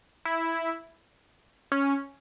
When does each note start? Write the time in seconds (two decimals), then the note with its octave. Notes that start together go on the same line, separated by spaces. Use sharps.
0.25 E4
1.72 C#4